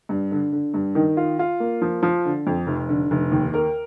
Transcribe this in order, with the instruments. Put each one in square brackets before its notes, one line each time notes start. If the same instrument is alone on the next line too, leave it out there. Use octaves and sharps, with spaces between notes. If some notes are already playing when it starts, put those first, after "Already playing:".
[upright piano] G2
D3
D3
G2
D#3
F4
F4
A#3
F3
F3
D3
F2
F1
D3
F1
D#2
A#4